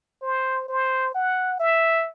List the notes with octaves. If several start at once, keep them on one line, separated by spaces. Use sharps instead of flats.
C5
C5
F#5
E5